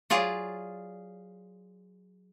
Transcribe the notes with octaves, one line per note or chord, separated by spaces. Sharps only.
F#3 F4 G#4 D5